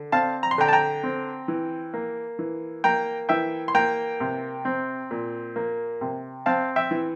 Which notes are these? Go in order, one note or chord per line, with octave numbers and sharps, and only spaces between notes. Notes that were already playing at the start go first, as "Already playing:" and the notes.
Already playing: D3
C4 F5 A5
A#5
C6
D3 G5 A#5
A5
G5 A#5
C4
E3
A#3
E3
A#3 G5 A#5
E3 E5 G5
C6
A#3 G5 A#5
C3
C4
A#2
A#3
C3
C4 F5 A5
E5 G5
E3